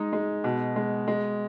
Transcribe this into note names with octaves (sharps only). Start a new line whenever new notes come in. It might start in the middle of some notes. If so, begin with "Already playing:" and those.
Already playing: G#3 D#4
G#3
B2
G#3
G#3